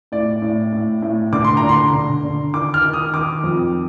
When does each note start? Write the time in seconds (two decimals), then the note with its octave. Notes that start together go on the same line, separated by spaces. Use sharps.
0.12 A2 D5
0.42 A2
0.73 A2
1.02 A2
1.33 D3 D6
1.45 C6
1.57 A#5
1.63 D3
1.69 C6
1.93 D3
2.23 D3
2.53 D#3 D6
2.74 F6
2.84 D#3
2.93 D#6
3.14 D#3 D6
3.44 F2